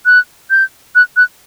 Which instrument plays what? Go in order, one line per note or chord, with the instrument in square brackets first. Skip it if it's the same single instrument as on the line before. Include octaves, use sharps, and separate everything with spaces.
[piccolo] F#6
G6
F#6
F#6